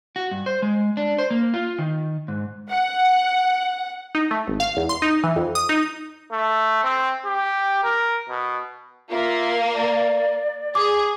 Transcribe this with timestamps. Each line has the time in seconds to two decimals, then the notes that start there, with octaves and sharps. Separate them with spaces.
0.16 F#4
0.31 G2
0.46 C5
0.62 G#3
0.97 D4
1.18 C5
1.31 A#3
1.54 F4
1.78 D#3
2.28 G#2
2.70 F#5
4.15 D#4
4.31 A3
4.48 G#1
4.60 F5
4.77 E2
4.89 C6
5.02 D#4
5.24 E3
5.36 F2
5.55 D#6
5.69 D#4
6.32 A3
6.84 C4
7.25 G4
7.84 A#4
8.29 B2
9.10 A#3 F4 E5
9.73 D5
10.75 G#4 D6